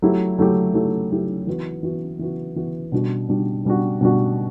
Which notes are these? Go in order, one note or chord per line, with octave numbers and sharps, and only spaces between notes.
F#3 A3 E4 G4
F#3 A3 E4 G4
F#3 A3 E4 G4
F#3 A3 E4 G4
E3 B3 F#4
E3 B3 F#4
E3 B3 F#4
E3 B3 F#4
B2 G3 D4 F#4
B2 G3 D4 F#4
B2 G3 D4 F#4
B2 G3 D4 F#4